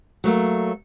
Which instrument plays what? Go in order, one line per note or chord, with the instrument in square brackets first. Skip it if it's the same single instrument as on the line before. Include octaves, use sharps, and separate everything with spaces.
[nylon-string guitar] F#3 A3 A#3